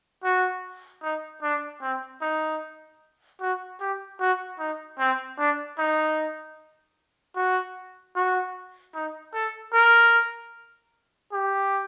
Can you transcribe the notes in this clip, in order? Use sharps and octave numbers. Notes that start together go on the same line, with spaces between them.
F#4
D#4
D4
C4
D#4
F#4
G4
F#4
D#4
C4
D4
D#4
F#4
F#4
D#4
A4
A#4
G4